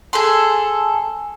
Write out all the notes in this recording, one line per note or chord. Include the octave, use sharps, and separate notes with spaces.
G#4 A4 C6